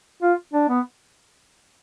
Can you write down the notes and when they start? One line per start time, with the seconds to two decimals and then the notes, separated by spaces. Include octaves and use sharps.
0.22 F4
0.53 D4
0.69 B3